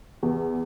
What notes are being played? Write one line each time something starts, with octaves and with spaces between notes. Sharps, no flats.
E2